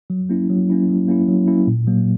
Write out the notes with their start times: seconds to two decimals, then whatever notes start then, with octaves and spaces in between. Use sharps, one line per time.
0.10 F#3
0.29 A#3 C#4 E4
0.50 F#3
0.70 A#3 C#4 E4
0.89 F#3
1.08 A#3 C#4 E4
1.28 F#3
1.47 A#3 C#4 E4
1.67 A#2
1.87 F#3 A#3